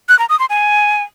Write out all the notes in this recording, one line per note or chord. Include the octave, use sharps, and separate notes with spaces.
F#6
A#5
D#6
C6
G#5